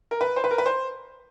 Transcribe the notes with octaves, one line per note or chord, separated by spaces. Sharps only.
A#4
B4
C5
B4
A#4
B4
C5